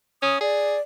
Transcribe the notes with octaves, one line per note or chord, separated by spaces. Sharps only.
C#4 D#6
G#4 D5